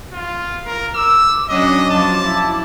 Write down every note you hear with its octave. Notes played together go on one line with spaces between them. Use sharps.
F4
A#4
D6 E6
F#3 C#4 D4 D#5
F3 F#3 A5
E4